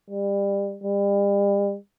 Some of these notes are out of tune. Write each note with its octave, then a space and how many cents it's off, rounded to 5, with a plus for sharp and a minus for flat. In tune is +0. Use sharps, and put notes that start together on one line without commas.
G3 +25
G3 +40